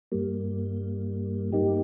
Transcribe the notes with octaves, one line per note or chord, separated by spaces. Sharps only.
G2 G3 A#3
G2 G3 A#3 D#4 G4